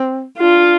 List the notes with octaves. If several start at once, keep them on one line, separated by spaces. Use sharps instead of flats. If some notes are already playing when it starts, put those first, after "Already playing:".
Already playing: C4
D4 F4